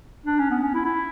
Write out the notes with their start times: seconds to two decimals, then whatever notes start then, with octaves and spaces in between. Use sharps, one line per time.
0.26 D4
0.39 C#4
0.51 B3
0.63 C#4
0.74 E4
0.85 E4